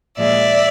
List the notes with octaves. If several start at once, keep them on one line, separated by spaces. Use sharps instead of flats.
A#2 F3 G#3 D5 E5